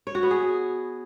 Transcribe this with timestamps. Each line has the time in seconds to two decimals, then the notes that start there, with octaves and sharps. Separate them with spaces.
0.07 C#5
0.15 F#4
0.23 B3
0.31 G#4